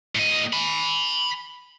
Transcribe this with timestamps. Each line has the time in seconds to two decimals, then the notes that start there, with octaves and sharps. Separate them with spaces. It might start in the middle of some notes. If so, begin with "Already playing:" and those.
0.15 A2 D#5
0.53 G#5 B5